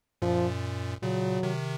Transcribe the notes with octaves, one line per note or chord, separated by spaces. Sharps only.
F#2 A#2 F3
A#2 C#3 F#3
C3 D#3